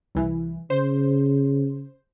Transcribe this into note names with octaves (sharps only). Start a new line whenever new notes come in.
C2 E3
C#3 C5